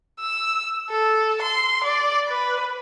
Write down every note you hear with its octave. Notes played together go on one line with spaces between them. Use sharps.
E6
A4
C6
D5
B4